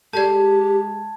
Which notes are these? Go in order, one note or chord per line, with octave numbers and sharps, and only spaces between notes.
G#3 G4 A4 D5 A5 G#6